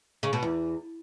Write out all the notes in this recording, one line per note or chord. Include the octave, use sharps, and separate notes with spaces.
C#3
B2
E2